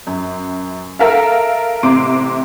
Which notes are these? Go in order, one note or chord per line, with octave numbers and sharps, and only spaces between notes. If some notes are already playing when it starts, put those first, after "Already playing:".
F#2
A4 A#4 E5 F5
A1 C3 C6 D6 D7